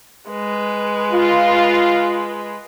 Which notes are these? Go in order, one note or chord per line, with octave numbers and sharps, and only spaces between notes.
G#3 B4
F4